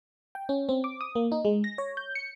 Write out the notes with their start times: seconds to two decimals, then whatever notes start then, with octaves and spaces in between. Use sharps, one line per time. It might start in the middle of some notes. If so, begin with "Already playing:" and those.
0.35 G5
0.49 C#4
0.69 C4
0.84 D6
1.01 D#6
1.15 A#3
1.32 D#4
1.45 G#3
1.64 A#6
1.78 C#5
1.97 G6
2.15 C#7